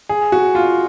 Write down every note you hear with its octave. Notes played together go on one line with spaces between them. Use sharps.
G#4
F#4
F4